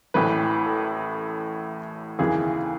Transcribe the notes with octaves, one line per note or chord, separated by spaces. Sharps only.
A1 A2 E3 B4
A4
D#2 C#3 E3 G#4